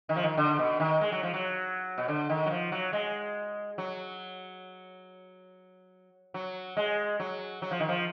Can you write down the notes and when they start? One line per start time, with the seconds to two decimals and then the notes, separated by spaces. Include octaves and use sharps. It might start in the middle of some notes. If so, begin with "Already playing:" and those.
0.09 D#3
0.16 F3
0.23 D#3
0.37 D3
0.59 B2
0.80 D#3
1.01 G#3
1.12 F#3
1.23 F3
1.34 F#3
1.98 B2
2.08 D3
2.29 D#3
2.46 F#3
2.50 F3
2.72 F#3
2.93 G#3
3.78 F#3
6.34 F#3
6.77 G#3
7.20 F#3
7.62 F#3
7.71 F3
7.80 D#3
7.89 F3